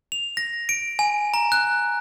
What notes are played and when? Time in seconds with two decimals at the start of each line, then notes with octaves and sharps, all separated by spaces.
0.12 F7
0.37 A#6
0.69 D7
0.99 G#5
1.34 A#5
1.52 F#6